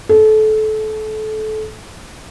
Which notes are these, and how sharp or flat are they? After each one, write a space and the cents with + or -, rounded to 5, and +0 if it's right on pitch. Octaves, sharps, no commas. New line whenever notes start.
A4 -25